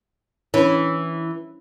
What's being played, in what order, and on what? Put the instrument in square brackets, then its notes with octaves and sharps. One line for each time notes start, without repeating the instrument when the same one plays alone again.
[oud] E3 [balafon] C#4 D4 C#5